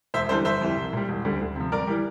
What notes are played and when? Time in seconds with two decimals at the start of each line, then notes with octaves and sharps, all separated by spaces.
0.14 E1 C5 E5
0.29 E2 D3 G3 A4 C5
0.45 G1 C5 E5
0.61 F2 E3 G3
0.77 C2
0.93 A#2 G3
1.09 E1
1.25 D2 D3 G3
1.41 D2
1.56 C3 F3
1.72 G1 A#4 D5
1.87 E3 G3